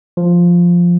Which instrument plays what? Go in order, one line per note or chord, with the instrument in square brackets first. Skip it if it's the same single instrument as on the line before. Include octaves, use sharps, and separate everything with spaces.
[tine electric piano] F3